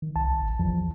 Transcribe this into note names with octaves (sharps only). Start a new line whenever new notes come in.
D#3
C2 A5
A1
E2 F3